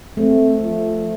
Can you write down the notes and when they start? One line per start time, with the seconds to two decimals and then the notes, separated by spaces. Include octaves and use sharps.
0.17 A3 C4
0.62 F3